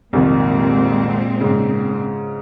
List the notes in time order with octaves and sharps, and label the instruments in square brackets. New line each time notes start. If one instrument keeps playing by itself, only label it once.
[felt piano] C2 F2 D#3 [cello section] A#2 G#3 C4
[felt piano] G#2 C#3